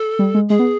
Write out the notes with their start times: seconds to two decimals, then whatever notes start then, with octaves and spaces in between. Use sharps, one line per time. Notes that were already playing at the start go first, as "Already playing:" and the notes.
Already playing: A4
0.19 G3
0.34 G#3
0.49 G#3 G#4
0.59 B3